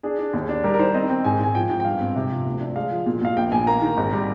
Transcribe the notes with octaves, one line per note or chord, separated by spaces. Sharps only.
D4 G#4
D4
D#2 G#4
D4
G3 A#4
A#4
D#3 C5
C4 D#5
C4
G#2 G#5
G#2 G#5
F3 G5
G#2 G5
G5
G2 F5
C4
C3
F3
D2
D4
G#3 F5
F3
A#2
A#2 F5
A#1 G5
A#1 G#5
A#3 A#5
D#3
G#1
G3